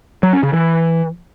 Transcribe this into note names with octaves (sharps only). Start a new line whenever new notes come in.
F#3
C#4
C#3
E3